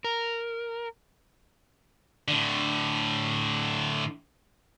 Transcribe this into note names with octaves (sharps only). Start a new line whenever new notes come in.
A#4
A2 D3